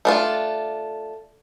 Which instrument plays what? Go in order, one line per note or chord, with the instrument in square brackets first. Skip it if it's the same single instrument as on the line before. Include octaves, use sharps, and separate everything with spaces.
[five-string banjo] A3 D4 F4